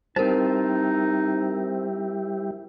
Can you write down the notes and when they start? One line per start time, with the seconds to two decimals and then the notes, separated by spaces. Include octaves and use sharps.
0.16 G3 C4 D#4 E4 G4 A#4 C5 A5